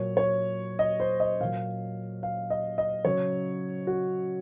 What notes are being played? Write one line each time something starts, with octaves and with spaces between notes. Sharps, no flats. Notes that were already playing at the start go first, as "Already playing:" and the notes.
Already playing: A#2 F#3 C#5
C#5
D#5
C5
D#5
A#2 F#3 F5
F5
D#5
D#5
C#3 F#3 C#5
F#4